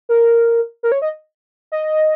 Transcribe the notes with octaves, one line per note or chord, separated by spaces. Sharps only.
A#4
A#4
C#5
D#5
D#5